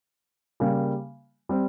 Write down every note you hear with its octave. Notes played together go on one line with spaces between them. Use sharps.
C#3 G3 A#3
G3 C4